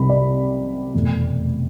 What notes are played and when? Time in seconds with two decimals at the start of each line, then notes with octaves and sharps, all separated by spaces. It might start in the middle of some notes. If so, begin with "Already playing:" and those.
Already playing: C2 C3 G3 B5
0.09 D5
0.94 F1 E2 B2 A3